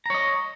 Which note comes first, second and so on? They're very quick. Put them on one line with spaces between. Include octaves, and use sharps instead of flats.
A#5 C#5 D#5